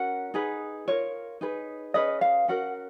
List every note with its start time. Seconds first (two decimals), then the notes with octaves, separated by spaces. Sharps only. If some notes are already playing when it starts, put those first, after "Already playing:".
Already playing: C#4 F#4 A#4 F#5
0.34 D#4 G#4 B4
0.88 F4 A#4 C#5
1.41 D#4 G#4 B4
1.94 C#4 G#4 B4 D#5
2.21 F5
2.48 C#4 F#4 A#4 F#5